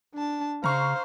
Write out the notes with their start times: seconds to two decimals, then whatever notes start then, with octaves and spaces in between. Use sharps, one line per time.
0.15 D4 A5
0.64 C#3 C5 F5 A#5 C#6